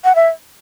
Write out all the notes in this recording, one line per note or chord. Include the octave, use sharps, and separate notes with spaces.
F#5
E5